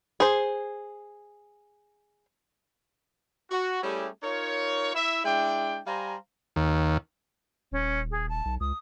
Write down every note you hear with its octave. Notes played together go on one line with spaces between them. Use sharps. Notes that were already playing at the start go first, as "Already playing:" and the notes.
G#4 C5
F#4
G3 A3 C#4 E4 G4 G#4
D#4 F4 A#4 C#5
E4 E5
G#3 D4 E4 G5
G3 C5 F5 G#5 A#5
D#2
D#1 C#4
G#4
A5
B1
C#2 D#6